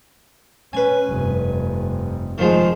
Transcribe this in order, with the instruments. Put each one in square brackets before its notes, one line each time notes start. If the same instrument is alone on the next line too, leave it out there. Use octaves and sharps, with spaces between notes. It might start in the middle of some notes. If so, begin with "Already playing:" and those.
[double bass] C#4 [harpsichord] B4 G#5
[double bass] F1 G2
[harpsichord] D#3 F3 G#3